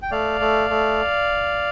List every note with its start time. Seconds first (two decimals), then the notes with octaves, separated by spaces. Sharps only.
0.02 G5
0.11 A3 D5 F5
0.40 A3
0.70 A3